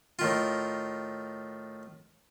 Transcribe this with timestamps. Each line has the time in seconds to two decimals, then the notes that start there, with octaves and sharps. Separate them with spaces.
0.19 A2 D#3 F4